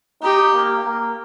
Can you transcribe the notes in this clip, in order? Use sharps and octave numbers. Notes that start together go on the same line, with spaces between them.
D#4 G4
A#3
A#3